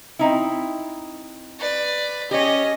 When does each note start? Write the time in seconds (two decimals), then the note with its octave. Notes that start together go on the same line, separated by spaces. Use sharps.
0.19 C4 D#4 E4
1.59 B4 D5
2.31 C#4 G4 C#5 D#5